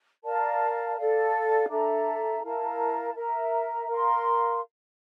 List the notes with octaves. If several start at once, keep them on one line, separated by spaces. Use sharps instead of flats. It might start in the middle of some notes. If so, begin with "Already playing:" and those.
A#4 D5 F5 A5
A4 D5 F5
D4 A4 E5 A#5
E4 A#4 F5 A5
A#4 E5 A#5
A#4 F5 C6